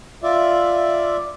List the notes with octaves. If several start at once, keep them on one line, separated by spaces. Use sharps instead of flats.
F4 D5 E5